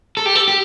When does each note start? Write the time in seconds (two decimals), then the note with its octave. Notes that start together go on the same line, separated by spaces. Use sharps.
0.17 A4
0.26 G4
0.35 A4
0.48 G4